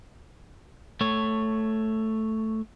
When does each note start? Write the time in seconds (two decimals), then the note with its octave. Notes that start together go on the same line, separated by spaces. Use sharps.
1.01 A3 C#5